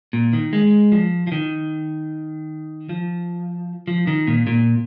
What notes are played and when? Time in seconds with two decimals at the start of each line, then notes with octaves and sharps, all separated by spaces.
0.13 A#2
0.33 D#3
0.53 G#3
0.92 F3
1.27 F3
1.32 D#3
2.89 F3
3.87 F3
4.07 D#3
4.27 A#2
4.47 A#2